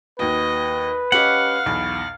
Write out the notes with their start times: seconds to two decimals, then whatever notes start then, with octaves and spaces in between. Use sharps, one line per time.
0.19 D#2 F#4 B4 D#5
1.12 C#4 G4 D#5 F5 F#5
1.66 B1 E2 B5